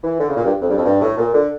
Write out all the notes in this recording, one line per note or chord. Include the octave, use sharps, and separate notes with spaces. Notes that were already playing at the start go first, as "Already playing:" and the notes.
E3
D3
C#3
A#2
G2
F2
G2
F2
G2
A2
A#2
D3